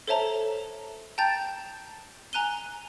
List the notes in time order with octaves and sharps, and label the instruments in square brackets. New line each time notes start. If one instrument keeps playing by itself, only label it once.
[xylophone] A4 C5 C#5 E5 A5 A#5
G5 A5 A#5 G6 A6
G#5 A#5 F#6 D#7 G7